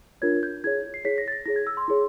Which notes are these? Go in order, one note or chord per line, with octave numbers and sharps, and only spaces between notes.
D4 F4 A#4 C#5 G#6
G6
E4 G#4 C#5 G#6
C7
E4 G#4 C#5 B6
A#6
A6
A#6
E4 G#4 C#5 A#6
G#6
E6
C6
E4 G#4 C#5